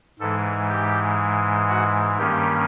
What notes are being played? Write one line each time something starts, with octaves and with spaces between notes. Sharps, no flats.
G#2 E3 G#3 A4
G4
F#4
G2 D#3 G3 A#3 C#4 G4